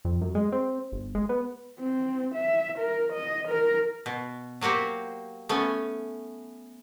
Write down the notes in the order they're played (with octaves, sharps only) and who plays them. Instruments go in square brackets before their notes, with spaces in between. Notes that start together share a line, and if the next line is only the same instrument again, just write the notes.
[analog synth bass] F2
F#2
G#3
C4
G1
G#3
B3
[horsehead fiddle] C4
E5
A#4
D#5
A#4
[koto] B2
F#3 A#3 F#4 G4 C5
A3 B3 C#4 G#5